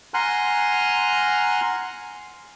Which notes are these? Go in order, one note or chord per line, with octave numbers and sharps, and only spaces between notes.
F#5 G#5 A#5 C6 F6 F#6